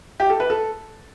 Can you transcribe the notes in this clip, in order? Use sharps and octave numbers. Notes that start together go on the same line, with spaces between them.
G4
A4
B4
A4